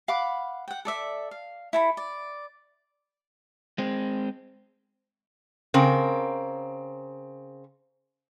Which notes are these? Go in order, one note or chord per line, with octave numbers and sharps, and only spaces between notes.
F5 F#5 B5 D6
F#5 G5
A4 D5 E5
F5
E4 A4 B5
D5
G#3 C4
C#3 C4 A#4